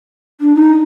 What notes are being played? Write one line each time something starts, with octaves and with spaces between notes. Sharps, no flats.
D4
D#4